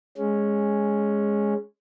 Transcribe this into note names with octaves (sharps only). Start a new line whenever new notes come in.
G#3 C#4